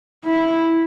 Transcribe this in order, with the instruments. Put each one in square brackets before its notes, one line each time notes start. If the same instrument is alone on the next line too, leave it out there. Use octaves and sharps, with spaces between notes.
[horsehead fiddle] E4